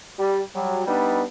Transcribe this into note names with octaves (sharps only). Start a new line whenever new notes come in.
G3
F#3 G3
G3 B3 D4 D#4